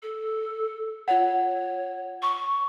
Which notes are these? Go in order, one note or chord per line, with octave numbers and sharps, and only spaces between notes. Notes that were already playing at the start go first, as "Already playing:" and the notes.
A4
F4 C#5 F#5
C#6